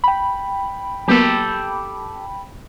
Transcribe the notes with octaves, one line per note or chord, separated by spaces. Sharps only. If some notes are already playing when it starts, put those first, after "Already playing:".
G5 B5
F#3 A#3 B3 G4 A4